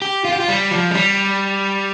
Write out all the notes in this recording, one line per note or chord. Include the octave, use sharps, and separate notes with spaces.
G4
F4
G4
F4
G3
F3
G#3
G3